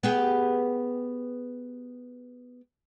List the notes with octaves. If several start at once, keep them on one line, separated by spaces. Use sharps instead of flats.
B3 G4 G#4